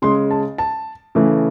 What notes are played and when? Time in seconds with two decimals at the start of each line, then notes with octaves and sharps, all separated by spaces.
0.02 C#3 G#3 C6
0.31 A5
0.58 A5
1.15 C#3 E3 A3